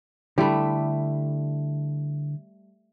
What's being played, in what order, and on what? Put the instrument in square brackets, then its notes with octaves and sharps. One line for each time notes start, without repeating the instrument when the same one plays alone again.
[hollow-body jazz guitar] D3 E4 [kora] G3 A3